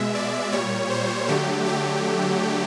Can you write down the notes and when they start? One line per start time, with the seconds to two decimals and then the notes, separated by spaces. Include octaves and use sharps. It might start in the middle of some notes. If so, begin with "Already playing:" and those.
Already playing: B2 G#3 E5
0.15 D5
0.52 A#2 G3 C#5
0.90 C5
1.28 D3 F#3 A3 G4
1.66 G4